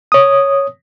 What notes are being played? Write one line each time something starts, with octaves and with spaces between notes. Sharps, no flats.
C#5 D#6